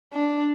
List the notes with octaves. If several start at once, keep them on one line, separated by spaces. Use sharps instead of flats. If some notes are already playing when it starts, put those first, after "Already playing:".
D4